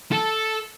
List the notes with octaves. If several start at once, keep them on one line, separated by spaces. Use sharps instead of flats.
A4